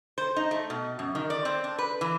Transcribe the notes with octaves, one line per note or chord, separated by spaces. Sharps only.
C5
D#4
A3
B2
F#2
D#3
D5
C4
D4
B4
E3